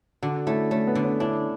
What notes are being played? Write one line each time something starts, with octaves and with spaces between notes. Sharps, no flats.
D3 D4 F#4
A3 C#4 E4
A3 C#4
B3
D3
C#4
C#4 D4 E4